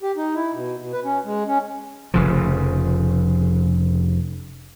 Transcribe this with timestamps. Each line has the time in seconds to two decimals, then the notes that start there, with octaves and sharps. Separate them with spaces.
0.03 G4
0.17 D#4
0.35 E4
0.54 B2
0.80 B2
0.93 B4
1.04 C#4
1.25 G#3
1.47 C#4
2.14 F1 C#3 F3